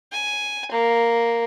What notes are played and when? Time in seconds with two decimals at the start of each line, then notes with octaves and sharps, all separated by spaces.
0.12 G#5
0.72 A#3